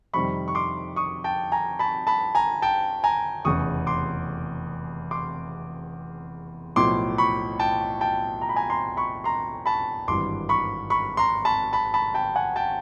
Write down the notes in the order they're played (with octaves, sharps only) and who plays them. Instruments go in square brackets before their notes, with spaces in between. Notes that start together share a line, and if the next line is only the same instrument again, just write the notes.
[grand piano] F2 C3 D#3 G3 B5 C#6
C#6
C6 D6
C#6 D#6
G5 A5
G#5 A#5
A5 B5
A5 B5
G#5 A#5
G5 A5
G#5 A#5
F1 E2 C#3 C#6 D#6
C6 D6
C6 D6
B1 A2 F3 C6 D6
B5 C#6
G5 A5
G5 A5
A#5
B5
G#5 A#5
A#5 C6
B5 C#6
A#5 C6
A5 B5
G#1 G2 E3 C6 D6
B5 C#6
B5 C#6
A#5 C6
A5 B5
A5 B5
A5 B5
G5 A5
F#5 G#5
G5 A5